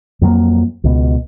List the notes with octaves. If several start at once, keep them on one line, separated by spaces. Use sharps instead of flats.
F2 F#3 G3 A#3
C#2 B2